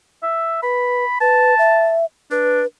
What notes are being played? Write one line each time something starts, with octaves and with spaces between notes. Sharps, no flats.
E5
B4 B5
B4 A5
E5
D4 B4